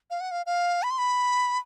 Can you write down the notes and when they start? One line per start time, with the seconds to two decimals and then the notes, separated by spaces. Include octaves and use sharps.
0.10 F5
0.21 F#5
0.31 F5
0.46 F5
0.83 B5
0.91 C6
0.98 B5